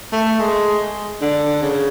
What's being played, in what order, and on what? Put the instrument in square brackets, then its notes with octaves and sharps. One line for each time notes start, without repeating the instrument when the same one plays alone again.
[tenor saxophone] A3
G#3
D3
C#3